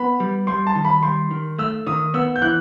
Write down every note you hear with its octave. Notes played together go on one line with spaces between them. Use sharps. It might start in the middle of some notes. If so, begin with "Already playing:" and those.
Already playing: B3 B5
G3
G3 C6
A5
D#3
B5
G3 C6
D#3
A3 E6
D#3 D#6
B3 E6
G6
E3 F#6